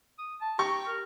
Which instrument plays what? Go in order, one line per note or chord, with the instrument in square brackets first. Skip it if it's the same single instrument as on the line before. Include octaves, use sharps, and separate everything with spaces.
[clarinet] D#6
A5
[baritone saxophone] G4 [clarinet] A#5 [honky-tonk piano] C#6
[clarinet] A#4